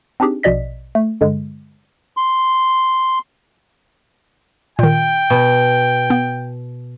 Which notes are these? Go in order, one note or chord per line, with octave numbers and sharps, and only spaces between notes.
C4 D4 D#4 G4 G#4
A#1 B2 D5 D#5 B6
A3
G2 D3 G#3
C6
A#2 D#3 G5
B2
B3